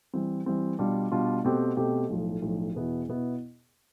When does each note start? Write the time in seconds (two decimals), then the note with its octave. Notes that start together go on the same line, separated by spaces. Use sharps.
0.14 E3 G3 C4
0.46 E3 G3 C4
0.79 B2 G3 D4 F4
1.12 B2 G3 D4 F4
1.45 B2 A3 C4 G4
1.77 B2 A3 C4 G4
2.09 B1 A2 F3
2.42 B1 A2 F3
2.74 E2 B2 B3 E4
3.09 B2 B3 E4